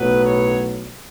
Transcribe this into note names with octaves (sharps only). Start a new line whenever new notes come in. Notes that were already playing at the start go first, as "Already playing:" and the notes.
Already playing: B1 A2 F#3 B3 B4
C#5